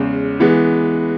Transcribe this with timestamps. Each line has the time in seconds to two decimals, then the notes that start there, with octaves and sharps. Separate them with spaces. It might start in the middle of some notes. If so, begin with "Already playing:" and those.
Already playing: E2 C#3 G#3
0.40 E3 G#3 B3